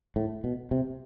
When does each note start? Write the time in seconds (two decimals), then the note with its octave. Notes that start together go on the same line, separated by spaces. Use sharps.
0.16 A2
0.44 B2
0.71 C3